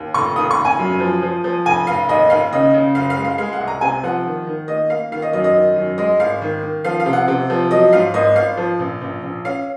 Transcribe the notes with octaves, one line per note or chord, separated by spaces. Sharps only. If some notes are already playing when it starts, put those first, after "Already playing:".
Already playing: D#2
F1 C#6
D#2 D#6
C#6
F1
G#5
F#2
F3
F3
F3
F1 G#5
F1 F5
D#2 D#5
D#2 F5
C#3 D#5
C#3
F#1 F5
F5
G#3
F5
G#3 F5
F#5
C2
A#5
C3 G#5
F3 F#5
D#3
D#3
A#3 D#5
A#3 F5
D#3 F5
D#5
F#2 D#5
D#5
D#3
F#2
G#3 D#5
G#1 F5
D#3
D#3
F3 F5
F5
C3
F#5
C3
F3
F#3 D#5
G#2 F5
G#1 D#5
G#1 F5
F3
A#1
A#1
A#1
C#4 F5